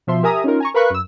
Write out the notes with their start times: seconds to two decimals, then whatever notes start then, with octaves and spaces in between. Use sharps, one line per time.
0.07 B2 F3 E5 C6
0.23 G4 A#4 E5 G#5 A#5 D#6
0.44 C#4 D#4 F4 A#4
0.60 G#5 A#5 C#6
0.74 A#4 B4 F5 B5 C#6 F#6
0.90 F#2 E6